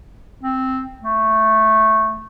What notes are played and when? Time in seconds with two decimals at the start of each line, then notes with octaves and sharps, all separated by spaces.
0.43 C4
1.01 A3